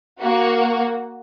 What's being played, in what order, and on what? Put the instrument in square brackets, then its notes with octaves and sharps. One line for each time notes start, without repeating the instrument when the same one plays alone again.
[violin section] A#3 F#4